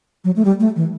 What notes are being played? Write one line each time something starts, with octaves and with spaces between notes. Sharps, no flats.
F#3
A3
G3
A3
E3